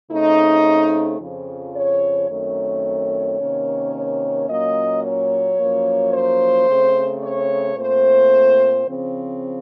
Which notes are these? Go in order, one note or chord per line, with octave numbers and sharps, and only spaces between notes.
C#3 A3 C4 D#4
F2 C#3 F3
C#5
F#2 D#3 A3 C4 C#5
C3 D#3 A#3 C#4
C#5
A#2 F#3 A#3 C#4 D#5
C#5
F#2 F3 A#3
C5
C#3 A3 C4
C#5
A#2 A3 C4 C5
C#3 F3 C4